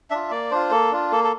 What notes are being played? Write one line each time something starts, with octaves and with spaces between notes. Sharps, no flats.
D4 F4 E5
A#3 D5
D4 F4 C5
A#3 A4
D4 F4
A#3 A4
A4